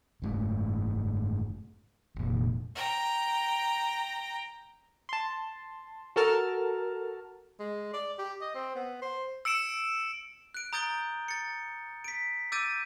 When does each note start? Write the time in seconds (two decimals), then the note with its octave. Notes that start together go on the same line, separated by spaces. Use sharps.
0.22 F#1 G#2 A3
2.16 F1 A#2
2.75 G5 A#5
5.09 A5 C6
6.16 F#4 A4 A#4 A5 F6
7.60 G#3
7.93 D5
8.19 G4
8.41 D#5
8.55 C4
8.76 B3
9.02 C5
9.45 E6 C#7 D7 E7
10.54 F#6 D7
10.73 A#5 D#6 G6 A6 D7 G7
11.28 A6 C#7
12.04 B6 D7
12.52 D6 E6 G6 A6 D7 D#7